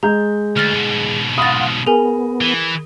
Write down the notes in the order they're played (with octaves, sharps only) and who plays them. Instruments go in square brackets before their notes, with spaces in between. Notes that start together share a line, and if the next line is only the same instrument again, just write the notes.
[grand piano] G#3 G6 [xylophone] A#5
[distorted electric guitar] D2 [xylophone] F6 A6
[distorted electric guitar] G#2 B2
[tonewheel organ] F5 F#5 C6 [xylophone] B5 A6 [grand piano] D#6 A#6
[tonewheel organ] B3 [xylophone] G#4 A#4 G#5
[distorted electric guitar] E3